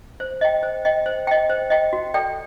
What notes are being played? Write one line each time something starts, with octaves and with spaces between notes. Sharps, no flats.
C5
D#5 G5
C5
D#5 G5
C5
D#5 G5
C5
D#5 G5
F#4
A4 D5 G5